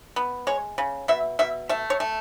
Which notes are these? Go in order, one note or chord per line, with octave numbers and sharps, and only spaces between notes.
B3
G#3 C#5
C#3
B2 E5
B2 E5
A3 E5
C#5
A3